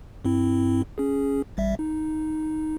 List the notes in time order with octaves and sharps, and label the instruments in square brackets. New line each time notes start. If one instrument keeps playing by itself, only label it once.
[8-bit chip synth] G2 C4 E4
C#4 G#4
A1 G3 E5
D#4